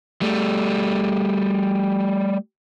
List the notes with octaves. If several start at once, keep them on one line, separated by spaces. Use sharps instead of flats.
G3 A3